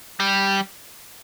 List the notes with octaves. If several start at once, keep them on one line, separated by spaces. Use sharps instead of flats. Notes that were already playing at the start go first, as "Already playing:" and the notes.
G3